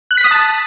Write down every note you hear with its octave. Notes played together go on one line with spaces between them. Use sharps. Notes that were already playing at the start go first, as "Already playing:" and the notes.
F#6
B6
D#6
A5